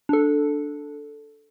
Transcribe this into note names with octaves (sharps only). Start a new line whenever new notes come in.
D4 A4